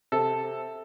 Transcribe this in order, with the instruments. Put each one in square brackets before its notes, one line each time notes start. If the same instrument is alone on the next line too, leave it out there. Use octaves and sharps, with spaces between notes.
[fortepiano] C3 A4